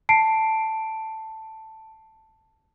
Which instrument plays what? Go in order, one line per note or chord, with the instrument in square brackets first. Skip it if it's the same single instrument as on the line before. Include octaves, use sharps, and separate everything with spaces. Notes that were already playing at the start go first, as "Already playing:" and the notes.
[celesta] A5 C7 D7